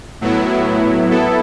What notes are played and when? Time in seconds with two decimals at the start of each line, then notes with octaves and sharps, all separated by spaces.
0.21 A2 F#3 B3 E4
1.11 B3 E4 A4